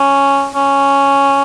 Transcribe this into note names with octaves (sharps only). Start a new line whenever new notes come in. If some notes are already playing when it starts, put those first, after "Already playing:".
Already playing: C#4
C#4